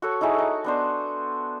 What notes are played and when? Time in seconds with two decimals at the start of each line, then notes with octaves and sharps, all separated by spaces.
0.02 F#4 A4 C#5
0.21 D#4 E4 F#4 G#4
0.34 D#4 A4
0.64 B3 D4 C5